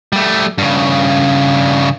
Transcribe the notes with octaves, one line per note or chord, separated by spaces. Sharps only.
G3 A3
G2 C#3